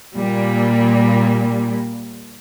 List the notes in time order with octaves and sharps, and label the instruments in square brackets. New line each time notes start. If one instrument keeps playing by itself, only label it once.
[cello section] A#2 G3 A#3